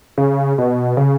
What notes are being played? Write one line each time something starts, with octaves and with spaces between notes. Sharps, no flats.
C#3
B2
C#3